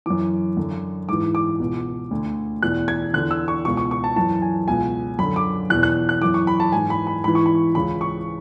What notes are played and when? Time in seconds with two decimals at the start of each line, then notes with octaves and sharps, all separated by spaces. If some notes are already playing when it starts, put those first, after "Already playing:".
0.06 F#2 E3 D6
0.57 F#2 D3
1.09 G#2 E3 D6
1.35 D6
1.60 C#2 B2
2.11 D2 D3
2.62 E2 B2 F#6
2.88 G#6
3.14 E2 D3 F#6
3.31 E6
3.48 C#6
3.65 C#2 B2 C#6
3.77 C#6
3.91 C#6
4.04 A5
4.16 F#2 E3 A5
4.42 G#5
4.68 C#2 B2 G#5
5.19 F#2 D3 B5
5.36 D6
5.70 E2 B2 F#6
5.83 F#6
6.09 F#6
6.21 F#2 E3 D6
6.34 C#6
6.47 B5
6.60 A5
6.72 G#2 E3 G#5
6.90 B5
7.07 B5
7.24 G#2 E3 B5
7.35 C#6
7.46 B5
7.75 C#2 C#3 E3 B5
8.01 C#6